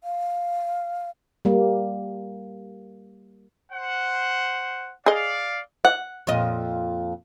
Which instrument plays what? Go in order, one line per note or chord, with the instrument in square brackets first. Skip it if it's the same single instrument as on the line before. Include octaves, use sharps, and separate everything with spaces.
[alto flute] F5
[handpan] G3 A#3
[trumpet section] C5 F#5
[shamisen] G#4 D#5 [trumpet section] D5 F5
[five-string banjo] F#5
[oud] F2 A#2 D#5